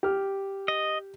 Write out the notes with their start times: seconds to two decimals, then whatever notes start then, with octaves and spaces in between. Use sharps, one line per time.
0.03 G4 F6
0.68 D#5